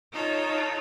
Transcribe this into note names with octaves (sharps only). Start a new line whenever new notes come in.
D#4 F4 A4 C#5